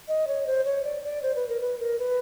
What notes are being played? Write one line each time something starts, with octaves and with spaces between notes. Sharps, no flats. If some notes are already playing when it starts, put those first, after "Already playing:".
D#5
C#5
C5
C#5
D5
D5
C5
B4
A#4
B4
A#4
B4